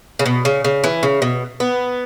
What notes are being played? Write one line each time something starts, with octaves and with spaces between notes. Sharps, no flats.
C#3
B2
C#3
C#3
E3
C#3
B2
B3